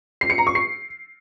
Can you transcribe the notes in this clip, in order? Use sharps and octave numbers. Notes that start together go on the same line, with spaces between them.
C7
C#7
A#5
C#6
C7